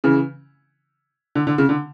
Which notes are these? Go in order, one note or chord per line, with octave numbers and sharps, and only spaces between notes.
C#3 E3
D3
D3
C#3
D3